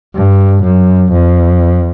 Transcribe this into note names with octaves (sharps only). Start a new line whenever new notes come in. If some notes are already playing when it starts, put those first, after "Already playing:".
G2
F#2
F2